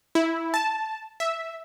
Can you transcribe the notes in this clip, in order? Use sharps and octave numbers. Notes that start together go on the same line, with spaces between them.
E4
A5
E5